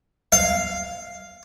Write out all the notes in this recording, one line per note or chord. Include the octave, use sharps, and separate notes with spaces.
F5